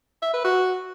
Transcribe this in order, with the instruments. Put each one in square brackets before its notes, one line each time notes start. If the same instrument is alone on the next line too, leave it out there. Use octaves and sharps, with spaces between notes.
[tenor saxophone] E5
B4
F#4